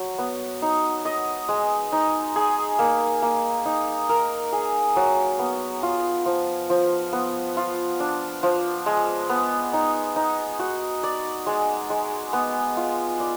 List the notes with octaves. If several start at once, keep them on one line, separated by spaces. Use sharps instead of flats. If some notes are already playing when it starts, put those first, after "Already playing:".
Already playing: F#3 F#4
B3
D#4
D#5
G#3
D#4
G#4
A#3
A#3
D#4
A#4
G#4
F#3
B3
F4
F3
F3
B3
F4
D4
F3
G#3
B3
D#4
D#4
F#4
D5
G#3
G#3
B3
F4
D5